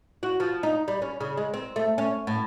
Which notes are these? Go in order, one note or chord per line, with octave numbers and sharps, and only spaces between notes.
F#4
F3
D#4
G3
C#4
C#3
G#3
C4
A3
C#4
A2